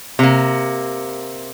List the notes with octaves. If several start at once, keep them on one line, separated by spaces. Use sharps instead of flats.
C3 A#3